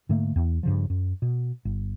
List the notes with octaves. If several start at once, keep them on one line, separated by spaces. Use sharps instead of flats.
G#2 D3 A3 A#3
E2
G2 C#3 F3
F#2
B2
G1